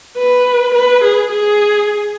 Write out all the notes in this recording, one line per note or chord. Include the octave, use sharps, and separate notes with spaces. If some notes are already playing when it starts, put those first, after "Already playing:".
B4
B4
G#4
G#4